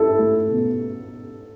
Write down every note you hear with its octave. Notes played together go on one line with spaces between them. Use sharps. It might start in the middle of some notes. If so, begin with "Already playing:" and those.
Already playing: E4 A4
A3
B2